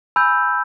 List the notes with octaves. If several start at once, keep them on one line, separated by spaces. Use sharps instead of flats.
G#5 B5 E6 G6